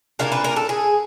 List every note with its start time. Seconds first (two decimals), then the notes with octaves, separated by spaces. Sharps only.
0.19 A#2 F#3 A#3 D4 F5
0.32 B4
0.44 A#4
0.56 A4
0.69 G#4